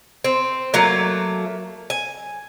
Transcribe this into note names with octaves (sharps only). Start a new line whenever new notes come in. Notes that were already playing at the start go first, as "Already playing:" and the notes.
C4
F#3 A3 A#3
G#5